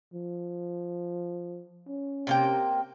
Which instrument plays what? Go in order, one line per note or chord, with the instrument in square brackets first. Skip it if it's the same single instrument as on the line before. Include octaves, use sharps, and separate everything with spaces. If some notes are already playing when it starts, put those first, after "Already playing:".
[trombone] F3
C#4
[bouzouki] C3 A#3 G5